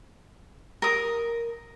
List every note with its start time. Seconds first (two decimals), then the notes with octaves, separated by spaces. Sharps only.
0.82 A#4 D#6